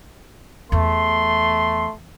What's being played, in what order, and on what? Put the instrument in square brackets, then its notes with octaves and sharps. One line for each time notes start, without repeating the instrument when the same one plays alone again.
[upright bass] E2 [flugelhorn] A3 [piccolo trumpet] C6